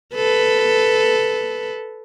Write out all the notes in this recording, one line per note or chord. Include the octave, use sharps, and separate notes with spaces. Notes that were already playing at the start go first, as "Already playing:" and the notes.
A4 B4